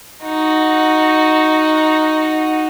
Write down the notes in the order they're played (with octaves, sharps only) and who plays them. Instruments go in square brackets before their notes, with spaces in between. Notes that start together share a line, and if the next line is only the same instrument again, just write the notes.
[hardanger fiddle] D#4 F#4